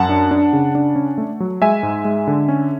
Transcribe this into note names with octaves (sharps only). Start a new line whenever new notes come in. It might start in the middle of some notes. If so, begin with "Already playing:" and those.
Already playing: F#2 F#5 A5
D4
D4
C#3
D4
C#4
A3
F#3
G#3 E5 G#5
G#2
G#3
D3
C#4